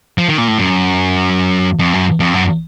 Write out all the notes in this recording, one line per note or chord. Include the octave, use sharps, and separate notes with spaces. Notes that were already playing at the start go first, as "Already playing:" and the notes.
F3
D#3
A#2
A2
F#2
F2
F#2
F2
F#2